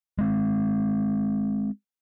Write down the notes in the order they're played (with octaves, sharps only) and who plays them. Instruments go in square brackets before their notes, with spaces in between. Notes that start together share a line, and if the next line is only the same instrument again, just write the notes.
[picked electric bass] G#3 C4